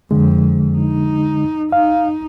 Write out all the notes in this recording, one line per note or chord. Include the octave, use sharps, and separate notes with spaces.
F2 D3 G#3
D#4
D#4 F5